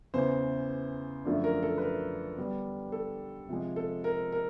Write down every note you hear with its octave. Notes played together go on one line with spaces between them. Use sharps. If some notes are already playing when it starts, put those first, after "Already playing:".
E2 C#3 E3 C5
F#2 D3 F3 A3 D4
A#4
A4
B4
A#4
D3 G3 B3 D4
A4
C3 F3 G#3
A4
A#4
A#4